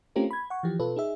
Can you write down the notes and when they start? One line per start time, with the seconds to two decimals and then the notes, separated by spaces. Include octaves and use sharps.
0.16 A3 C4 C#4 F4 G4 A#4
0.31 B5 G#6
0.50 F#5 C#6
0.63 E3 F3 G4
0.80 B2 F4 A4 B4
0.96 D#4 G#4 E5